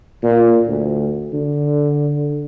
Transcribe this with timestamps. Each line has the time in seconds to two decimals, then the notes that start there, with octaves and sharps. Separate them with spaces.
0.23 A#2
0.67 D2
1.33 D3